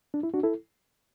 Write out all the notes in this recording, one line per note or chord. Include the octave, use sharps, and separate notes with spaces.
D4
E4
D4 F#4
E4 A4